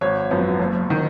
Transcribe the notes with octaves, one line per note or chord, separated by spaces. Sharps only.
G#1 C#5
F#2 F3 B3
F#1
D#3